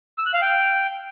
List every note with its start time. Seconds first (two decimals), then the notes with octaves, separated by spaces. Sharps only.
0.18 E6
0.26 F#6
0.34 F5
0.42 G5